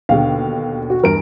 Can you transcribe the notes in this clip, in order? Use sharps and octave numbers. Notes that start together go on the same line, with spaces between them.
D#2 B2 D3 F5
F#4
E2 G2 A#4 D7